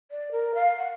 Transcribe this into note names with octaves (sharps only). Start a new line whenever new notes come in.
D5
A#4
F5
F#5